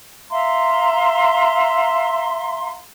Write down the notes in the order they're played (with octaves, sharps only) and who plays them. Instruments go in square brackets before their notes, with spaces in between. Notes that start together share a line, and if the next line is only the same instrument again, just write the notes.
[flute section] E5 F5 A#5 C6